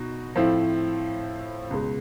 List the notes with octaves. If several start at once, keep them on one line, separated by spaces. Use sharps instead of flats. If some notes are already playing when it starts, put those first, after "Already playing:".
Already playing: B2 D#4 F#4
A2 F3 A3 C4 E4
C#2 B2 G#3